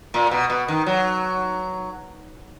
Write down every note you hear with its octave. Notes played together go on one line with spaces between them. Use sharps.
A#2
B2
B2
D#3
F#3